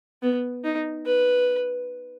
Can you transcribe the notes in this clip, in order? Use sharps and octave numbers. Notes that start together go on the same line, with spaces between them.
B3
D#4
B4